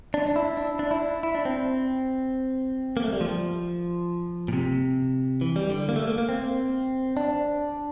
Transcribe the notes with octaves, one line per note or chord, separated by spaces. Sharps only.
D4
D4
E4
D4
D4
E4
E4
D4
C4
A#3
A3
G3
F3
A#2
C3
E3
G3
D3
A#3
A3
A#3
A#3
C4
D4